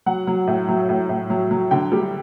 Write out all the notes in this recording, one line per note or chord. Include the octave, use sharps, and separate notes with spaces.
F#3 F#5
F#3
A2
F#3
A2
A2
F#3
F#3
D3 G5
G3